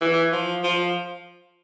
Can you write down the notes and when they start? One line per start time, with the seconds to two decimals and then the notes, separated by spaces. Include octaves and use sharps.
0.02 E3
0.32 F3
0.64 F3